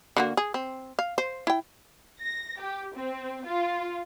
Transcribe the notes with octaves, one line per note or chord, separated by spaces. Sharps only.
D3 A#3 F#4
G#4
C4
F5
C5
E4 G5
A#6
G4
C4
F4